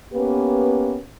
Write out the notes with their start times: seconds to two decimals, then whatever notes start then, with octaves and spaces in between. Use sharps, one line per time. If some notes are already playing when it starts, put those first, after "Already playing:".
0.13 A#3 B3 C#4 G4 B4